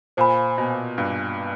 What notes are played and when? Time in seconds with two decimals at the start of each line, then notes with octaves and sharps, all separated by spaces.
0.17 A#2 C5 F5 G#5 B5
0.58 B2
0.98 G2